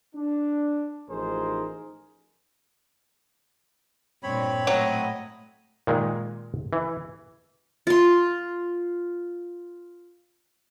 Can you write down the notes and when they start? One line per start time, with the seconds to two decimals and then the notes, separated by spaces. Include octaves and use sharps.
0.15 D4
1.09 A1 F3 D#4 G#4 A#4 C5
4.23 G2 A#2 C4 C#5 B5
4.67 A2 F#3 D#5
5.87 A#2 D#3 G#3
6.73 E3
7.87 F4 C6